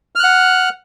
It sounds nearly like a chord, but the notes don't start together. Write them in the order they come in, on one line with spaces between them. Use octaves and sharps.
F6 F#6 F#5